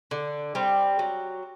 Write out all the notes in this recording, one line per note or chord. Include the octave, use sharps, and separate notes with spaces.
D3
G3 C4
F#3